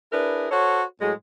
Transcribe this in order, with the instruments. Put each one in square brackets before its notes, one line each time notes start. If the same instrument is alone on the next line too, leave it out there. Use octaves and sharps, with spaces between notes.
[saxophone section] D4 E4 G#4 A#4 B4
F#4 A4 C5 C#5
A2 F#3 G#3